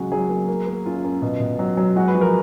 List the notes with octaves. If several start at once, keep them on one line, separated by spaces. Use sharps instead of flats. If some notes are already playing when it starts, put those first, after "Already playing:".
Already playing: C#2 F#3 G#3 F#4
F#3 G#4
A#3
A#3
A#3
F#2 F4
F#2
B2
B2
F#3
F#3
G#3 F#4
B4
F3
A#4